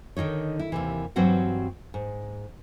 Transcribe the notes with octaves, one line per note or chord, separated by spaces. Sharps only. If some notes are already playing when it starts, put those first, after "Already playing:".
D3 D#3 F3 D#4 C#5
E4
D#2 C3 E3
G2 E3 F#3 C4 F#4 F#5
G#2